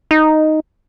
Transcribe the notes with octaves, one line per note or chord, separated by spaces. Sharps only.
D#4